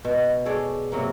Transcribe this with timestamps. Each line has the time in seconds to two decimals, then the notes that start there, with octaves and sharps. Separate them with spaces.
0.05 B2
0.45 G#4 A4 C#5 D5
0.92 C3 F#3 A#3